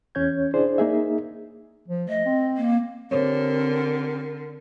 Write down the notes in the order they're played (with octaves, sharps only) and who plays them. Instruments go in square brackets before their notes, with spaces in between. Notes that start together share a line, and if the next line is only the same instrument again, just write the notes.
[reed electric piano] E2 C#4 C#5 G6 G#6
D4 E4 G#4 C5 D5
A#3 D#4 G#4 E5
[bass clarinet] F3
[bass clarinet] A3 [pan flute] D#5
[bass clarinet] C4
[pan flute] A#3
[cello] D3 [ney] C4 [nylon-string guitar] G4 C5 C#5 [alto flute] A#4